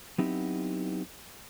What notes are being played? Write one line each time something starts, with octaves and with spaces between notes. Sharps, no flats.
F#3 B3 C4 D#4 E4 G4